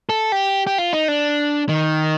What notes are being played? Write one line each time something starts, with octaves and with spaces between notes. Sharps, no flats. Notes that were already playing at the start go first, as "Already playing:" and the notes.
A4
G4
G4
F4
D#4
D4
D#3